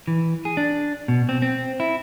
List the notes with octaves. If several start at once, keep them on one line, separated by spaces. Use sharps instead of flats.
E3
G#4
D4
B2
C4
C4
E4